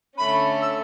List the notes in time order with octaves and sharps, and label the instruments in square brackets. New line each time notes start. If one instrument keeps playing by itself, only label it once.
[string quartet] D3 A3 C#4 [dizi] B5
[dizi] E6